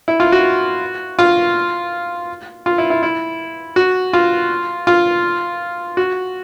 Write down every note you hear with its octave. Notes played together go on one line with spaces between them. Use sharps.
E4
F4
F#4
F4
F4
E4
E4
E4
F#4
F4
F4
F#4